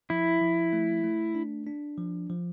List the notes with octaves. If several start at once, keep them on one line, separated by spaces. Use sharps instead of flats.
F3 E4
F3
A3
A3
D4
D4
F3
F3